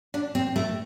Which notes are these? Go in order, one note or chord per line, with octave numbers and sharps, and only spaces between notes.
D4
C4
A3